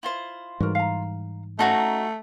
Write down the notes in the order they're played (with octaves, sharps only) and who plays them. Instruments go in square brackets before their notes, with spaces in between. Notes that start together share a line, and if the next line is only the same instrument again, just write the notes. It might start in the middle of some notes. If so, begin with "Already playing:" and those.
[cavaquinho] E4 F4 C5
[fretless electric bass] G#2 E3 G3 [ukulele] F#4 A#4
[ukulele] F5 A#5
[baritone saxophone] A3 [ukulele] C#4 D#5 A5 [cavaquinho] D#4 F#4 A#5